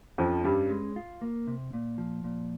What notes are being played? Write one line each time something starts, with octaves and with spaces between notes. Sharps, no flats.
F2 F3 C#4
G2 G3 C#4
G#3
F4
A#3
C3
A#2
F3
A#2